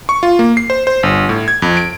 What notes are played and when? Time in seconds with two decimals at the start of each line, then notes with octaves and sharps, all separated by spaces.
0.09 C#6
0.23 F4
0.39 A#3
0.57 C7
0.70 C5
0.87 C5
1.03 G1
1.29 A2
1.48 G#6
1.62 F2
1.77 D7